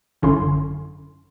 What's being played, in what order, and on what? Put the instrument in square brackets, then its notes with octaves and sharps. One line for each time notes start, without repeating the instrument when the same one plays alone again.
[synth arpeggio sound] G#1 F#2 D3 C#4 E4 C6